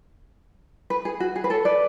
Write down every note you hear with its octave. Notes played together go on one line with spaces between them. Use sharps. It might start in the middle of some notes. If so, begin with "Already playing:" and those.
B4
G#4
F#4
G#4
B4
A4 C#5
B4 D5